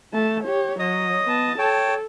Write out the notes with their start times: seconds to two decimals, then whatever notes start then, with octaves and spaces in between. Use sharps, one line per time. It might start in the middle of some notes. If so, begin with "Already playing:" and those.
0.13 A3 A5
0.44 G4 C#5
0.79 F#3 C#5 D#5 D#6
1.24 B3 A5
1.58 A4 C#5 G5 A5